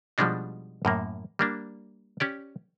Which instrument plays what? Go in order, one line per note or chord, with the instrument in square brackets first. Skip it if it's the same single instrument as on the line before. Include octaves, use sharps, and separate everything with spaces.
[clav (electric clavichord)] B2 F3 G3 G#3 D4 D#4
F#2 A2 A#3
G3 A#3 D4
C#4 G4 D5